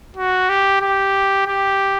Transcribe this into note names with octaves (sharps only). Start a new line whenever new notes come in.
F#4
G4
G4
G4